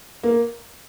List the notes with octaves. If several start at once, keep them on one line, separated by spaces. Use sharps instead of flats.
A#3